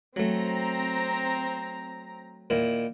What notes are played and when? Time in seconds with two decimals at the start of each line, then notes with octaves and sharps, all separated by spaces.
0.16 F#3 A3 C4 A#5
2.50 A#2 D#3 E4